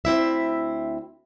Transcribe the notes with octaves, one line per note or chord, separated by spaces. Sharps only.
D2 C4 E4 E5